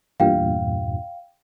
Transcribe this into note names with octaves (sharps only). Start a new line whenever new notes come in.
E2 G2 A#2 F5 G5